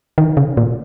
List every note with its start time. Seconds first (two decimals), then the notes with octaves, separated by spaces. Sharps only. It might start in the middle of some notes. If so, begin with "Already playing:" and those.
0.18 D#3
0.37 C#3
0.57 A#2